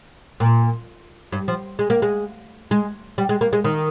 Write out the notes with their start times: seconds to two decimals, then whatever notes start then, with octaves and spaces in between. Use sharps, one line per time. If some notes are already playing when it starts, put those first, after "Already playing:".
0.40 A#2
1.32 G2
1.48 F3
1.79 G#3
1.90 A#3
2.02 G#3
2.71 G#3
3.18 G3
3.29 G#3
3.41 A#3
3.53 G#3
3.64 D#3